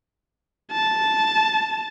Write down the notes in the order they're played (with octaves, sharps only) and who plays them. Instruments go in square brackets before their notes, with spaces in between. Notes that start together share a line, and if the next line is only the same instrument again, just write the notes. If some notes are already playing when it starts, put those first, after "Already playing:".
[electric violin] A5